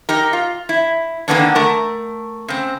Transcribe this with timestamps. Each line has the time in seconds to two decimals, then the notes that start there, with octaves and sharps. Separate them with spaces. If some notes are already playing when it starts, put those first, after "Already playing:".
0.09 D#4 G4 A#4
0.33 F4
0.69 E4
1.28 D3 D#3 A#3 B3 C#4 D4
1.55 A3 A#4
2.48 C#3 C4